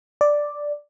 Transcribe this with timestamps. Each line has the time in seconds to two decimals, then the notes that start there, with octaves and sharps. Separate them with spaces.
0.21 D5